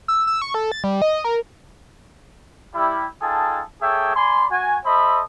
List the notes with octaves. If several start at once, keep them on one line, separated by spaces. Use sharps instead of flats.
E6
E6
C#6
A4
A6
G3
D#5
A#4
G3 E4
D#4 F4 G#4 A4 G5 A5
A#3 G#4 A4 C#5 E5 G5
D5 G#5 B5 C6
F#4 G#5
A4 C5 D#5 E5 B5